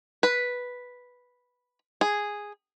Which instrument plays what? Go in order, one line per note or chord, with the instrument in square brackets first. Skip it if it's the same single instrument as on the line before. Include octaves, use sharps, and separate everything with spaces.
[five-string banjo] B4
G#4